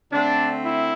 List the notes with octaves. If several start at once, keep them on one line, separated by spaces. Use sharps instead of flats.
D3 A3 C4 D4
E4